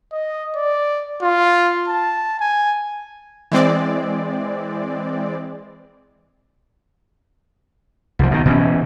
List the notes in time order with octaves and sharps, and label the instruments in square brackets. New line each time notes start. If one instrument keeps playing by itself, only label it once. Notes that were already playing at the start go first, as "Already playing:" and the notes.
[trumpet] D#5
D5
F4
A5
G#5
[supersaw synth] E3 G#3 C4 D5
[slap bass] C2 F3
B2 D#3
B2 E3 C#4